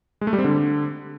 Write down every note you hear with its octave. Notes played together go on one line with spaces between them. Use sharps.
G#3
A3
G3
C4
D3